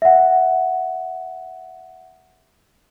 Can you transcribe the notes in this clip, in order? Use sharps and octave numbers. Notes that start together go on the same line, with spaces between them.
E5 F#5